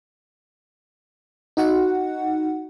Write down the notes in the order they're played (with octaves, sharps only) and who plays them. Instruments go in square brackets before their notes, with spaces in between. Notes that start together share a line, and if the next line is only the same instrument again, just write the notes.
[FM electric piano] D#4 F#4 F#5